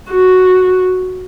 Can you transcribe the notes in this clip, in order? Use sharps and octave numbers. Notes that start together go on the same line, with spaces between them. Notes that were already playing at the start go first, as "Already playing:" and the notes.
F#4